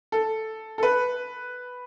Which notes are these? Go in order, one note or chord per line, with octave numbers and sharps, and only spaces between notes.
A4
A4
B4